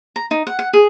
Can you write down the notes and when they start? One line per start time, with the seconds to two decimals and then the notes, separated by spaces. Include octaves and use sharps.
0.16 A#5
0.31 D#4
0.47 F#5
0.59 F#5
0.73 G#4